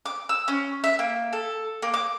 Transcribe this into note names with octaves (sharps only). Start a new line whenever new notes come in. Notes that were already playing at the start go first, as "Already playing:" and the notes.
D6
E6
C#4
E5
A#3
A4
A#3
D6